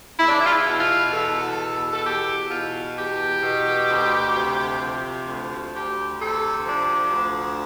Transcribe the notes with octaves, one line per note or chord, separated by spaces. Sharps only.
E2 E4
D4
E4
F4
E4
B2
F4
E2 A4
B2
A4
E2 G4
B2 F4
E2 G4
B2
D2
C3
F3
D2
D2 G4
C3 A4
F3 D4
D2